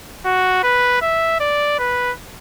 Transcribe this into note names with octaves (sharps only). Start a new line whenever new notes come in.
F#4
B4
E5
D5
B4